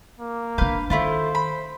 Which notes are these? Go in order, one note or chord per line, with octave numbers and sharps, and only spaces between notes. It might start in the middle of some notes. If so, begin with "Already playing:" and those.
A#3
C#4 D4 B4 F5 G6
D#3 A3 E4 F4 C5
B5